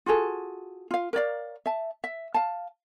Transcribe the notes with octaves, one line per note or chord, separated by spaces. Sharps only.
F4 F#4 G#4 A4
F4 F5
A#4 C#5 D5 F5
E5 A5
E5
F5 A5